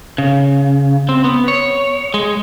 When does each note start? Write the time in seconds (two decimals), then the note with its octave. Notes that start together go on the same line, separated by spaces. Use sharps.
0.18 C#3
1.09 C4
1.24 B3
1.48 C#5
2.14 G#3